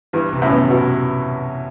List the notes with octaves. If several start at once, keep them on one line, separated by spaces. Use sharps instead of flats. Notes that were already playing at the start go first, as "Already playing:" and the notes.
G2 E3
C3
F#2 A2
B3
B2 E4